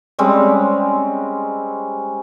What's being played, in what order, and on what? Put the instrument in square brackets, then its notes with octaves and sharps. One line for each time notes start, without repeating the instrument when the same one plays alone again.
[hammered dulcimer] G3 G#3 C4 C#4